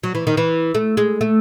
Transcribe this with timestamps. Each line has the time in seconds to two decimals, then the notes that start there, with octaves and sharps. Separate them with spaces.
0.03 F#3
0.15 E3
0.27 D#3
0.37 E3
0.75 A3
0.97 G#3
1.21 A3